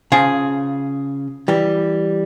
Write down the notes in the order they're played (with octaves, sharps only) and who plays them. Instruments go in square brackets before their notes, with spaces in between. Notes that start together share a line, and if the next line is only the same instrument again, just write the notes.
[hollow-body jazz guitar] C#3 [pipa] F3 G#4
[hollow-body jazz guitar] E3 G3